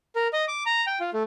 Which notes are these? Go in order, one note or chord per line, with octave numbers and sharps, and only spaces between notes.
A#4
D#5
D6
A#5
G5
F4
A3